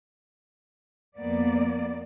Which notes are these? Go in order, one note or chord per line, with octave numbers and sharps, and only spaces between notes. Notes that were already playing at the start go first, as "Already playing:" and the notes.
F2 A#3 B3 D5